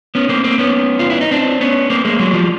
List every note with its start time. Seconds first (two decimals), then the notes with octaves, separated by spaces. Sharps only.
0.15 B3 C#4
0.29 A#3 C4
0.44 A#3 C4
0.58 B3 C#4
0.99 F4
1.10 E4
1.21 D#4
1.31 C4 D4
1.61 B3 C#4
1.90 A#3 C4
2.05 G#3 A#3
2.19 F#3 G#3
2.34 F3 G3